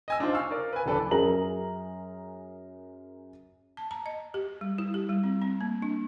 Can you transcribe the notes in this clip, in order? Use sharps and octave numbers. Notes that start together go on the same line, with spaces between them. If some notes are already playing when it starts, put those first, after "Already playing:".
D#5 G#5 E6
D4 D#4 F4 C5
F5 C#6 E6
A#4 D5
B4 G#5
D1 D3 E3 A4 B4 D5
F#2 G#4 A#4 A#5 F#7
A5
A#5
D#5
G4
G3
E4
G4
G3
C4
C4
A#3
D4